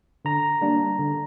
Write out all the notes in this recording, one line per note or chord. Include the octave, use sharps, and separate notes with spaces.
D3 A#5
G3 A#3 D4
D3